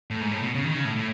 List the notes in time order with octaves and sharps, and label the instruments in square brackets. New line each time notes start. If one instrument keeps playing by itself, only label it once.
[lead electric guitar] A2
G#2
A2
B2
C#3
D#3
C#3
A2
A2